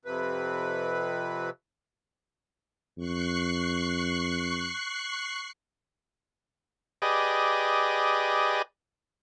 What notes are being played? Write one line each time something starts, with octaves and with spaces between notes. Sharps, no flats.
F2 C3 B4
F2 C#6 F#6 C7
G4 G#4 B4 D5 D#5